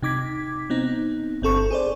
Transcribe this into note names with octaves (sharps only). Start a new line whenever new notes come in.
C3 D#4 D6 G#6 B6
B3 C4 D#4
G1 C4 A4 C#6
G#4 C5 D5